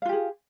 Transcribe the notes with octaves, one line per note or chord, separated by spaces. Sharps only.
F4 G4 G#4 F5